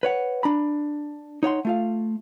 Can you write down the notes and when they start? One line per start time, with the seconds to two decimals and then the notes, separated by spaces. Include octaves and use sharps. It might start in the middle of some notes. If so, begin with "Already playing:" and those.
0.03 B4 C#5 F#5
0.43 D4 A#5 B5
1.43 D#4 C#5 F#5 C6
1.65 A3 F4 F5